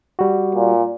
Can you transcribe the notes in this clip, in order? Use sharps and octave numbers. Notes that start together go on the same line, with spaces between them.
G3 F#4
A#2